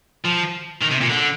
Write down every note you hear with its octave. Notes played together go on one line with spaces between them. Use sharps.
F3
D#3
C3
A#2
D3